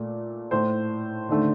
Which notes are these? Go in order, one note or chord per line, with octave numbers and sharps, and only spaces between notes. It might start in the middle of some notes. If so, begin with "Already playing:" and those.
Already playing: A#2 A3
A2 A3 C5
D#2 D3 A3